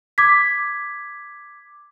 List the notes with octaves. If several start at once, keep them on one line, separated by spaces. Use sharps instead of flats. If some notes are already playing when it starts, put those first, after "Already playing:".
D6 G#6 B6